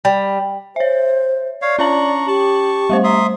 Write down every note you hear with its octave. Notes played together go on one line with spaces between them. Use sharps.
G3
C5 C#5 E5
C#5 D5 F5
C#4 D4 C#5 A#5 C#6 F#7
G4 A5 C#6
G3 A3 C5
E5 A#5 C6 D#6